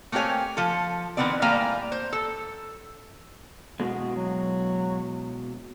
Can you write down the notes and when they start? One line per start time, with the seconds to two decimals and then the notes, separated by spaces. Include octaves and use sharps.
0.12 A3 A#3 C4 G4 C#5 G#5
0.57 F3 A4
1.17 D#3 E3 B3 C4 D5
1.42 A2 G3 A#3 G#5 A#5
1.92 C5
2.13 A4
3.80 B2 G#3 F#4
4.16 F#3